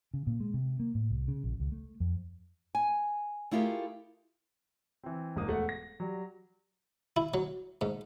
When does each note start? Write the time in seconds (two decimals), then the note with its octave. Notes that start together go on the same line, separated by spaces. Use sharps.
0.14 C#3
0.27 A#2
0.40 G#3
0.54 C3
0.80 A#3
0.95 A2
1.10 C2
1.28 C#3
1.44 A#1
1.60 C#2
1.72 A3
2.00 F2
2.75 G#5
3.51 A3 E4 F4 G4 G#4 A#4
5.03 E3 C4
5.36 F1 G#2 A#3 D#6
5.47 E1 A3 F#5
5.69 A#6
6.00 F#3 G3
7.16 E4
7.34 F#3
7.81 G#2